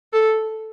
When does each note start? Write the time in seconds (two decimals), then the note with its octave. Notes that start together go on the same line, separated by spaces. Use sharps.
0.13 A4